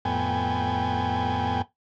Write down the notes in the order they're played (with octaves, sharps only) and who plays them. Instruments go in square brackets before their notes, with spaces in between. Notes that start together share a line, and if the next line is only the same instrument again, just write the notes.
[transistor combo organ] F2 A2 B3 G5 G#5